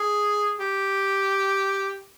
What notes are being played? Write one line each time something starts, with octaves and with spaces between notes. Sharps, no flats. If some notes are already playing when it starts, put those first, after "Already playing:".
Already playing: G#4
G4